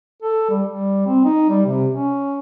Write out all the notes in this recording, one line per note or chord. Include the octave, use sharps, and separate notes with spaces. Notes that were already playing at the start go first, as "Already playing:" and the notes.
A4
G3
G3
C4
D#4
G3
C3
C#4